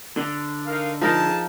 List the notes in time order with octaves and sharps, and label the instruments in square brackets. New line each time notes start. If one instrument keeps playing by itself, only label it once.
[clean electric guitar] D3
[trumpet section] D#4 A#4 F5
[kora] F3 D#4 A#4 [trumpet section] G#4 A5